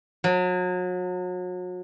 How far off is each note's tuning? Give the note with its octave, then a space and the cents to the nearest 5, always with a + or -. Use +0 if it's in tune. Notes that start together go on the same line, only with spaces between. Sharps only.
F#3 -35